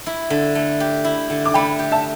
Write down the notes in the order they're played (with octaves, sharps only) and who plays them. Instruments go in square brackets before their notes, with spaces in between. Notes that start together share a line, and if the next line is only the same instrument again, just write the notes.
[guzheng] E4
D3
A3
G4
E4
D3
[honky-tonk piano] D6
[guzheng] A3 [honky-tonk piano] G5 B5
[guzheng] G4
[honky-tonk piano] E5 A5